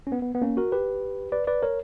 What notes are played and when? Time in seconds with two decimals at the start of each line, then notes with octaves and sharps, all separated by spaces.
0.07 C#4
0.12 B3
0.22 B3
0.35 B3
0.42 A#3 C#4
0.57 F#4 A#4
0.72 G4 B4
1.32 B4 D5
1.47 B4 D5
1.63 A#4 C#5